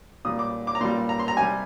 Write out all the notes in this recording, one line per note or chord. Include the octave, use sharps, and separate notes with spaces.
A#2 G3 D#6
D6
D6
A#5
A#2 G3 C6
A#5
C6
A#5
C3 G3 G#5